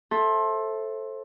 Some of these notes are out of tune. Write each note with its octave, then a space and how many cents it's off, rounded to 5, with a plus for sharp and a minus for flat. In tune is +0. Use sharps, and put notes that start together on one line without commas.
A4 +0 C5 +25 E5 +0